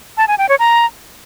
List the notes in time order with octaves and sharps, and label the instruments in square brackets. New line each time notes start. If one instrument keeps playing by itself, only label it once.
[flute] A5
G#5
G5
C#5
A#5